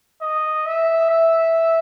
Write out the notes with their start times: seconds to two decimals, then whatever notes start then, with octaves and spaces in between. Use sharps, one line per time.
0.22 D#5
0.66 E5
1.10 E5